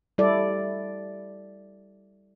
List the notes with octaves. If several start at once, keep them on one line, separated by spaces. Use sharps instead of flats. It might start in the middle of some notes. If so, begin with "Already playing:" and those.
G3 E4 A4 D5